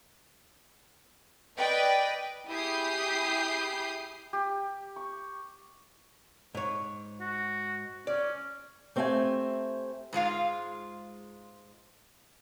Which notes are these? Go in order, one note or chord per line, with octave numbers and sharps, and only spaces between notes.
B4 D5 D#5 G5
E4 G4 G#4 D#6 G6 C7
G4
C#6
G#2 C#5
F#4
C#4 D5
A3 C4 G4 E5 F5 G#5
G#2 G#3 F4 F5